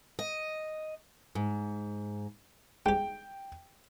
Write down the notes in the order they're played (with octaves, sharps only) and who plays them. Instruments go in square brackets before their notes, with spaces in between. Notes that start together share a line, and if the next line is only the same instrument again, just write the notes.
[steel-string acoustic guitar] D#5
G#2
[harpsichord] G#3 G4 [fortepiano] G5